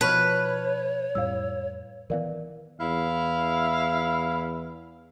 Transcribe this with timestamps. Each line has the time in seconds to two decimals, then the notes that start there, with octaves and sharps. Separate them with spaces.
0.01 B2 F3 B4 C#5 A5 C#6 F6
1.15 F2 A2 G3 F5 E6
2.10 D#3 E3 B3 A#4 D5 F5
2.80 E2 E4 F5